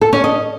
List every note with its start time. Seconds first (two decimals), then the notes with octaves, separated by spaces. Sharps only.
0.01 A4
0.13 C#4
0.24 D#5